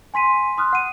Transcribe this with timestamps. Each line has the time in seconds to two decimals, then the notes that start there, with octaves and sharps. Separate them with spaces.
0.14 G#5 C6 B6 D#7
0.58 C6 D#6 F6 F#6
0.73 F#5 D#7